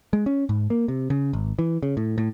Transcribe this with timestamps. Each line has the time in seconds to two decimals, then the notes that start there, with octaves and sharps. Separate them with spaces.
0.13 G#3
0.26 C#4
0.49 G#2
0.70 A#3
0.88 C3
1.10 C#3
1.33 G#1
1.59 E3
1.83 C#3
1.97 A2
2.18 A2